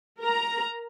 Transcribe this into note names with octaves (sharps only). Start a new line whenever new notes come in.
A#4 A#5